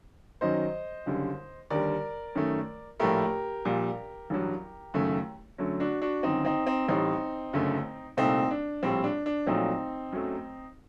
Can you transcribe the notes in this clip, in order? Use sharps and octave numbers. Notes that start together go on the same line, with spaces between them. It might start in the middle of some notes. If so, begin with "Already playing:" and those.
F#2 D#3 F#3 C5 D#5
F#1 F#2 D3 G3
D#2 D3 G3 A#4 D5
F#2 D#3 A3
A#1 A2 A3 G4 A#4
A#1 A#2 G3
A1 G2 F#3
F#1 F#2 D#3 F#3 A3
F#2 D3 F#3 A3
D4 F#4
D4 F#4
G1 F#2 D#3 C4 D#4
C4 D#4
C4 D#4
A1 A2 G3 C4 D#4
F#1 F#2 D3 A3
C2 A#2 A3 C4 D#4
D4
A#1 A2 G3 C4
D4
D4
A#1 A#2 F#3 A3 C4 D#4
F#2 F#3 A3